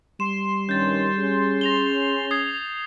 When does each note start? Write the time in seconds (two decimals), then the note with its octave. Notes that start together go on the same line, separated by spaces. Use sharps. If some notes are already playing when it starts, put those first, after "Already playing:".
0.20 G3 C6 E7
0.69 G2 D#3 C#4 G6 A6
1.18 C#4 G#4
1.61 A#6 F7 G7
2.31 D#6 G#6 C7